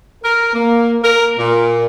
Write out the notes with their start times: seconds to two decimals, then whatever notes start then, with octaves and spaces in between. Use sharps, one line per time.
0.23 A#4
0.53 A#3
1.02 A#4
1.37 A#2